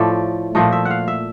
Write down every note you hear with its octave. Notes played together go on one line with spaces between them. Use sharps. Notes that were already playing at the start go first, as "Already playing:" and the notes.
Already playing: A2 F3 A3 D5
A#2 F3 A3 D#5
E5
F#5
F5
E5